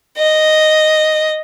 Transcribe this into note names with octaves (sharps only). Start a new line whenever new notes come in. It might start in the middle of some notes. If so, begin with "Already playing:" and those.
D#5